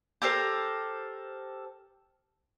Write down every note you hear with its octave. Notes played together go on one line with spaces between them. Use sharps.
G4 A4 A#4 C5